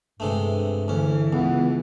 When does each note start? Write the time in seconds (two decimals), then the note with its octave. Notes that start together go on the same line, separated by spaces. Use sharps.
0.20 G2 C3 G#3 A3
0.88 D2 E3 C#4
1.33 C#2 B3